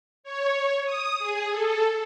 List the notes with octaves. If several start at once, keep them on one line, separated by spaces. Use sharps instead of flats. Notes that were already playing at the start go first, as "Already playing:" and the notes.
C#5
D#6
G#4
A4